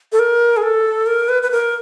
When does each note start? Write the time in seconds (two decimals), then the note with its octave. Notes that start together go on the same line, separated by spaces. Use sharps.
0.12 A4
0.19 A#4
0.57 G#4
0.62 A4
1.07 A#4
1.29 B4
1.43 B4
1.51 A#4